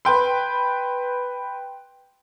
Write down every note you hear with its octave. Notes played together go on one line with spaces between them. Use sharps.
B4 G5 C6